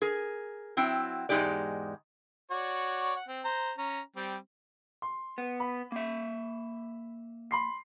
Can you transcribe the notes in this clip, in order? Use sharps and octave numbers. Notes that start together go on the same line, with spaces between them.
G#4 A#4
F#3 C4 E4 G5
E2 G#2 G#3 D#4 G4 D5
F#4 C#5 D5
F#5
C4
C5 A#5
C#4 A#5
G3 C4
C6
B3
B5
A#3 E5
B5 C6 C7